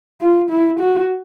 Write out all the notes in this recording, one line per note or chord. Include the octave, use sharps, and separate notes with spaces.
F4
E4
F#4